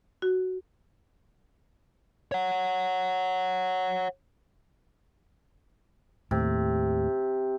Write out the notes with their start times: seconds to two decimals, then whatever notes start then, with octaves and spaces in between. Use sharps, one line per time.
0.22 F#4
2.32 C#5 F#5
6.31 D#2 A2 C3